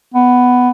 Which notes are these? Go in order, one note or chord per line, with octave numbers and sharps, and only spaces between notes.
B3